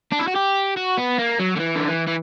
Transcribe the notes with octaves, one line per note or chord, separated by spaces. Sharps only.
D4
E4
F#4
G4
F#4
B3
A#3
F#3
D3
E3
D3
E3
E3